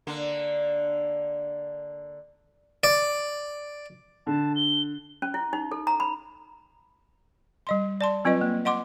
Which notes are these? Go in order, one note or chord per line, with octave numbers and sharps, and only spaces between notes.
D3 A#3
D5
D3 A5
G7
C#4
E4
D#4
A4
A#5
B5
G3 D#5 C6
D5 A5 C6
F#3 C4 F4 B4 D#5
A#3
D#5 F#5 C6 D6